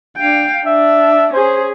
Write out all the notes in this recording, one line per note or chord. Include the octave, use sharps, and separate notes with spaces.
D4 F5 G5
D4 E5
C#4 G#4 C5